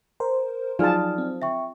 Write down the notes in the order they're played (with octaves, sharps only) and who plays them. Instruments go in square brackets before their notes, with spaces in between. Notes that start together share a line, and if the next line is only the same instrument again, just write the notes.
[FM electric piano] A#4 C5
[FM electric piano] F3 F#3 [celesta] D#4 D5 F6 [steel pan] F4 G#4 A5
[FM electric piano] C4
[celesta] E5 G5 C#6